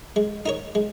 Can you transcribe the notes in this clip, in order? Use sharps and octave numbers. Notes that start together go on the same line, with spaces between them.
G#3
D#4 A#4 C#5
G#3